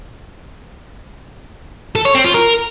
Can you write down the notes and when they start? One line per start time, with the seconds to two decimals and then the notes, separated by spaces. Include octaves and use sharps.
1.95 A4
2.05 C#5
2.15 C4
2.25 F4
2.34 A#4